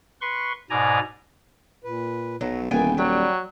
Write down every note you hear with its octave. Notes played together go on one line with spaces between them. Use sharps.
B4 C6 C#6
G#2 B2 D5 G#5 A#5
A#2 B4
B1 F#3
D#1 D#3 E3 A#3 B3 G5 G#5
F#3 G3 G5